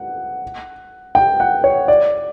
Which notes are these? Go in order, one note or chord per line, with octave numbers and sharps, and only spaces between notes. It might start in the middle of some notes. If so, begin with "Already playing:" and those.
Already playing: F#5
G5
F#5
C#5
D5